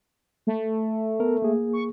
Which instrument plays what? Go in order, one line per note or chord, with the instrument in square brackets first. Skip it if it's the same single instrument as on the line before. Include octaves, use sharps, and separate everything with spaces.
[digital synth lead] A3
[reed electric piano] B3 A#4
A#3 G#4
[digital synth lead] C#6